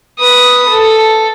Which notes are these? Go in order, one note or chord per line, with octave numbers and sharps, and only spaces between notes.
B4 D#6
A4